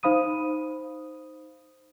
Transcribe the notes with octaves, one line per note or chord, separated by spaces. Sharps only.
D#4 C5 F5 B5 D#6 D#7